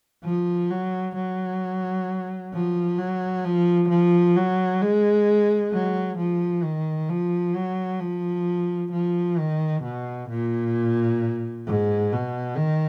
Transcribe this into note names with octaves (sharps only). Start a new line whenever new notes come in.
F3
F#3
F#3
F3
F#3
F3
F3
F#3
G#3
F#3
F3
D#3
F3
F#3
F3
F3
D#3
B2
A#2
G#2
B2
D#3